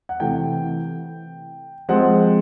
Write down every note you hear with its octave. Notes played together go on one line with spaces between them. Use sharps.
F#5
C3 E3 A3 G5
F3 G#3 C4 F#5